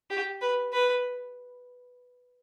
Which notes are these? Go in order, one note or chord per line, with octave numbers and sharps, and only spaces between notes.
G4
B4
B4